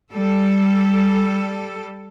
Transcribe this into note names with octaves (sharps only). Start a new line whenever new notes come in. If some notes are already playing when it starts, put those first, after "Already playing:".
G3 A4